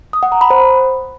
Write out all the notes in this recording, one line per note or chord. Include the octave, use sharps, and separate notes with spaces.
D#6
F#5
A#5
B5
C5